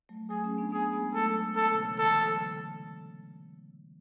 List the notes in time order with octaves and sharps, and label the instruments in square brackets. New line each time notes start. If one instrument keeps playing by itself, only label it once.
[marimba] F#3 A3
[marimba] F#3 A3 [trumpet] G#4
[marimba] A3 C#4
B3 D4
[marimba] B3 D4 [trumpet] G#4
[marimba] G#3 B3
[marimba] F#3 A3 [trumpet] A4
[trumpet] A4
[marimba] B2 D3
C#3 E3
[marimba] C#3 E3 [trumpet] A4
[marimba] D3 F#3